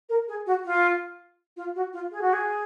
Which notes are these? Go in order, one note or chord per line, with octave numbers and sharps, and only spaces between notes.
A#4
G#4
F#4
F4
F4
F#4
F4
G#4
F#4
G#4